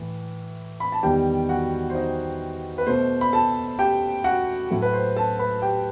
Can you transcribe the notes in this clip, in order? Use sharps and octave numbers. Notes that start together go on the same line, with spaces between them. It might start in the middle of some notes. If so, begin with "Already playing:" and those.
Already playing: A2 E3
B5
A5
E2 D#3 G3 G4 G5
F#4 F#5
C5
D#4 D#5
B4
B2 A3 C5
B5
A4 A5
G4 G5
F#4 F#5
A2 F#3 A3
B4
C5
A4 A5
B4 B5
G4 G5